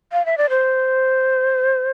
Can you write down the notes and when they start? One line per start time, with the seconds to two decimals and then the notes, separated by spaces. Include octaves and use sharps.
0.12 F5
0.26 E5
0.38 D5
0.50 C5